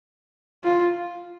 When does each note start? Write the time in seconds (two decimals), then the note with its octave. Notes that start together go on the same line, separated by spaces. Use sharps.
0.64 F4